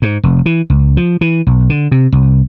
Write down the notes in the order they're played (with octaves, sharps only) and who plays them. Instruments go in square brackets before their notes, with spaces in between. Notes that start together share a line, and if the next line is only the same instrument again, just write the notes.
[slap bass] G#2
F1
E3
C#2
F3
E3
B1
D3
C3
C2